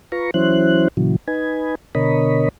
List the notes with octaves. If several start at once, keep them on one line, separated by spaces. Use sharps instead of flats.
F4 B4 A#5 C#6
E3 F#3 C#4 E4 C5 F#6
A#2 C#3 E3 F#3
D#4 B4 G#5
B2 D3 A#4 C#5 D#5 B5